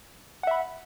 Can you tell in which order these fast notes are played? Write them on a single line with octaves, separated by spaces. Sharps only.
F#5 E5 B5